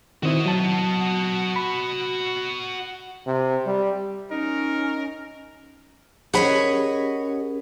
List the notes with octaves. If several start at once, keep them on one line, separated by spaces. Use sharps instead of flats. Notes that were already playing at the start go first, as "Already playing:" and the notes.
D#3 C4 E4 F#4 D#5
F#3 A5
B5
C3
G3
C#4 D#4 A#4
C#4 G4 G#4 A#4 C#5 D#5 F#5 B5